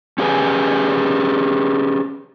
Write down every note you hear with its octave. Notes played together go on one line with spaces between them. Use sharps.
C#4 G4 G#4 B4 G#5